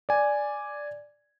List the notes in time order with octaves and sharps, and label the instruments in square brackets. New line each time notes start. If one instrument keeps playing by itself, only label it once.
[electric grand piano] D5 G#5